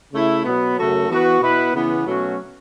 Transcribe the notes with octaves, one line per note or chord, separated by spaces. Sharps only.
C#3 A3 E4
B2 F#3 B3
F#2 C#3 A3 F#4 A4
E3 B3 F#4 B4
B2 B3 E4 B4
C#3 E3 B3
B2 F#3 A3 C#4 F#4